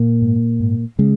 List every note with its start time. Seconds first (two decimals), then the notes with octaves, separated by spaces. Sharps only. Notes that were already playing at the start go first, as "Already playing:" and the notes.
Already playing: A#2 A#3
0.22 G#2
0.60 G#2
0.99 C#3 G#3